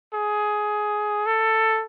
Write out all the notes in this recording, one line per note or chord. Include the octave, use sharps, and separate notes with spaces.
G#4
A4